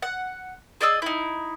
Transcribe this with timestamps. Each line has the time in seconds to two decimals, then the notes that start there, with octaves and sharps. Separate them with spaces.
0.02 F#5
0.81 G#4 D5 D#5 E6
1.02 D#4 E4